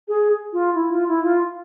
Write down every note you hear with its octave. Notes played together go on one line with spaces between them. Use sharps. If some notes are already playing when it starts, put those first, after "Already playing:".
G#4
F4
E4
F4
E4
F4